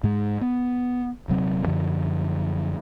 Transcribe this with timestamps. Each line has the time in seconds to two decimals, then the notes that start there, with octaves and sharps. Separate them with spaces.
0.04 G#2 G#3
0.41 B3
1.28 D#1 C3 F#3 C4
1.66 F#2 D3 F3